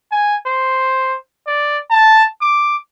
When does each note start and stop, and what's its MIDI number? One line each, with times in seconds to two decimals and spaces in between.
0.12 0.36 80
0.46 1.16 72
1.47 1.78 74
1.91 2.25 81
2.41 2.76 86